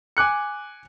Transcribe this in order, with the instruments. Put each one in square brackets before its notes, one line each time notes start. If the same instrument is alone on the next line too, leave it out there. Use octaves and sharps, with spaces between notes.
[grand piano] G#5 D6 F#6 C#7